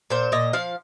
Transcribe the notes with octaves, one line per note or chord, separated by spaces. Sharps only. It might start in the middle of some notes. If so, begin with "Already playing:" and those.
A#2 C5
A#2 D#5
F3 F5